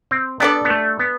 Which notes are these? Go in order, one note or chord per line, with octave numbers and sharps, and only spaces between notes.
C4
G3 B3 D4 A4 D5
B3
A3
B3